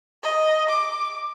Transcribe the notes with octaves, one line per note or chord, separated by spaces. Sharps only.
D#5
D6